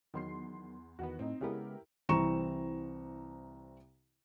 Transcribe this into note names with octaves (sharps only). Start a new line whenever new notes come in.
E2 D#3 F#3 C6 C7
E2 D#3 B3 F#4
A2 C4 D#4
C#3 G#3 B3 E4 G4 A#4
C2 E3 C4 A#5 C#6 E7